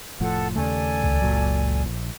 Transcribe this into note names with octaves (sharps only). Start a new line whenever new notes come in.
F1 A2 F3 A4 F#5
D#2 C#3 A3 A4 D5 G#5
C#2
F#1 A#2 F#3
A#1